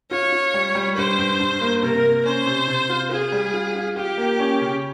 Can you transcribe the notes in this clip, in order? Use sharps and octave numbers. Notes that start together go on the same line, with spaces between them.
F4 C#5
F4
G3
G3
G2 C5
G2
G2
A#3
C3 A#4
A#3
C#4 C5
C3
C3
F4
F4 G#4
G3
F4
F4
F4 G4
A#3
C#4
C#3